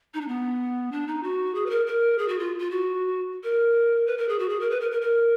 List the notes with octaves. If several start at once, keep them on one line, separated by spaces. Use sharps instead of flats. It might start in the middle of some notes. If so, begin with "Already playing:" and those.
D#4
D4
B3
D4
D#4
F#4
G#4
B4
A#4
A#4
G#4
F#4
F4
F4
F#4
A#4
B4
A#4
G#4
F#4
G#4
A#4
B4
A#4
A#4
A#4